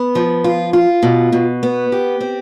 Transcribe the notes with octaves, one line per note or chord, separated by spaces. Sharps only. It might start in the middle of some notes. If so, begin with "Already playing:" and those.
Already playing: B3
F3
F4
F4
B2
B2
B3
G4
C4